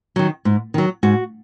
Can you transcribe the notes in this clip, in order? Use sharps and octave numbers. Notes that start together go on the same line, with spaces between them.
D#3 F#3
G#2
D#3 F#3
G#2 F#4